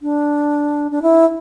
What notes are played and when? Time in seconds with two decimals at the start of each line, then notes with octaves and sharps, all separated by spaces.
0.02 D4
0.91 D4
1.02 E4